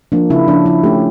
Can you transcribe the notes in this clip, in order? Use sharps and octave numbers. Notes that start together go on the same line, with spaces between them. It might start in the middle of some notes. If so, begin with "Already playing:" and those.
F3 A#3 D4
C#3 E4
F3 C#4 D4
F3 E4
A3 C#4 G4